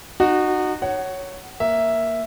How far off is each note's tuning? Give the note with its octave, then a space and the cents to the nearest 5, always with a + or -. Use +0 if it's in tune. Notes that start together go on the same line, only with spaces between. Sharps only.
D#4 -30 F#4 +0
C#5 +0 F#5 +20
A#3 +0 E5 +0